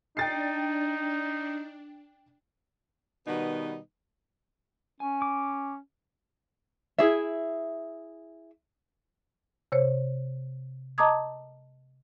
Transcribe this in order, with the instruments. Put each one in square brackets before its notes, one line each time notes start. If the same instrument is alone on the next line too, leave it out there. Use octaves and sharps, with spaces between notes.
[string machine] D4 [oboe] D#4 [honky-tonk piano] G5 A6 C7
[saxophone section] B2 D#3 G3 B3 D#4 B4
[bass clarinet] C#4 [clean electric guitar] G#5
[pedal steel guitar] D6
[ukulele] E4 G#4 E5
[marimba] C3 C5 C#5
D#5 A5 A#5 D6 D#6 G#6